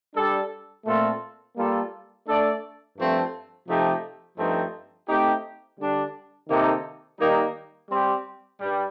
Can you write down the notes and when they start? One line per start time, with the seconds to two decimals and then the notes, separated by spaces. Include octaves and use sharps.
0.15 G3 D4 A4
0.86 A#2 A3 C4 F4 A4
1.57 G3 A#3 F4 A4
2.27 A3 D4 A4 D5
2.96 G2 F3 A3 C4
3.68 C3 F3 A3 D#4 G4
4.38 G2 F3 A3 C4 D#4
5.08 A3 C4 D#4 G4
5.79 D3 G3 D4
6.49 C3 D#3 A#3 D#4 A4
7.20 D#3 G3 A#3 D#4
7.89 G3 C4 G4
8.60 G2 G3